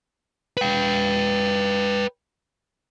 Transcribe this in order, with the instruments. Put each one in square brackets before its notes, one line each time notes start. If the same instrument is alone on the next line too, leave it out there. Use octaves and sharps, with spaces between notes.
[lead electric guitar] B4 G5